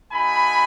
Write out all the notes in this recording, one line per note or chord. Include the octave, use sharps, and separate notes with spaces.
A3 D#4 F#4 G#5 B5